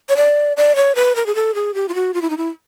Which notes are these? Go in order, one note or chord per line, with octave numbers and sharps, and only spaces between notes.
C#5
D5
D5
C#5
B4
A#4
G#4
A4
G#4
G4
F4
F#4
F4
E4
D#4
E4